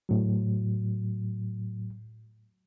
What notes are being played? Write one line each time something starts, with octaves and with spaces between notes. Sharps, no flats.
A2 F#3